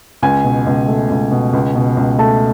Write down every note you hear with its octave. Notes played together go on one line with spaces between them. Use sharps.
C#2 G#5
B2
C#2
A3
C#2
B2
C#2
B2
C#2
A3 A5